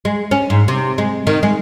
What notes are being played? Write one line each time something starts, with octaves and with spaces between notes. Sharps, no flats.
G#3
C#4
G#2
C3
G#3
D#3
G#3